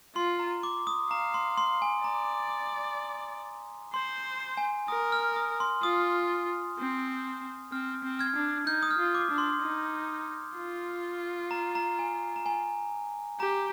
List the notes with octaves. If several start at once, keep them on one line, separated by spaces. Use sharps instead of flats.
F4 C6
A#5
D6
D#6
F5 A#5
C6
C6
G#5
D5 A#5
C5 C6
G#5
A#4 D#6
F6
D#6
C6
F4 D#6
C4
C4 F6
C4
F6 G#6
D4
D#4 G6
D#6
F6
F4
D6
D4
C6
D#4
F4
A#5
A#5
G#5
A#5
G#5
G4 A#5